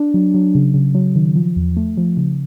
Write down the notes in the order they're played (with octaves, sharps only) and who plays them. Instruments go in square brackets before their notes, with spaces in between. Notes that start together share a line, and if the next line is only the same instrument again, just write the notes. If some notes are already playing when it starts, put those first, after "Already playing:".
Already playing: [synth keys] D4
F#3
F#3
C#3
C#3
F#3
D#3
F3
E2
A3
F3
C#3